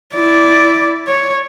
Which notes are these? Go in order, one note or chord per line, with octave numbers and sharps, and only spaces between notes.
E4 D5
C#5